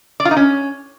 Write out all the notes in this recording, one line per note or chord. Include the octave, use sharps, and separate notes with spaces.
D5
F4
D#4
C#4